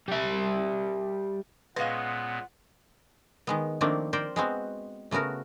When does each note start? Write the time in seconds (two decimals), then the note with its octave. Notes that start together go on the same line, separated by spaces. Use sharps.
0.08 G3 E5
1.76 A#2 G#3 B3 C#4 B4 D#5 F5 F#5
3.47 D#3 G#3 B3
3.81 D#3 F3 A3 A#3 C4 D4
4.13 A#4 C5 D5 G5
4.36 G#3 B3 C4 F#4
5.11 C#3 A3 B3 F#4 A#4